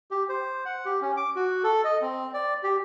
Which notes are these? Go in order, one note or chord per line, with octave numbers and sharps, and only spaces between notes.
G4
C5
F#5
G4
C#4
D6
F#4
A4
D#5
C4
D5
G4